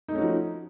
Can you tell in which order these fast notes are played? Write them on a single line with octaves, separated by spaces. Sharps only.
D#4 A3 C#4 F#4 F3